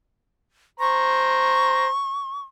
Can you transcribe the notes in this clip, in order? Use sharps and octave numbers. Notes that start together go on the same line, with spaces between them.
C5 A#5 C#6